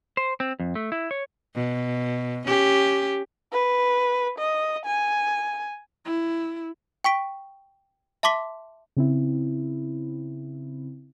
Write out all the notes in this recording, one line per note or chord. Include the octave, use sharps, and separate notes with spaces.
C5
C4
F2
A3
E4
C#5
B2
C#4 G4
B4
D#5
G#5
E4
G5 C#6 B6 D7
E5 A5 C6 D6 B6 G7
C#3 C4 E4